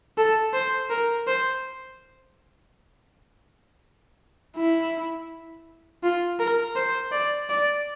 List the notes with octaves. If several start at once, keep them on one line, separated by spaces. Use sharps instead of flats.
A4
C5
A#4
C5
E4
F4
A#4
C5
D5
D5